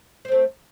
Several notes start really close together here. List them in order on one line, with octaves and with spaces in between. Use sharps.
C5 C4 A3